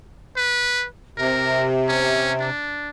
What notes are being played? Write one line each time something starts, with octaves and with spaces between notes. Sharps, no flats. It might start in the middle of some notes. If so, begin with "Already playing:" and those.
B4
C3 A#4
C#4
D4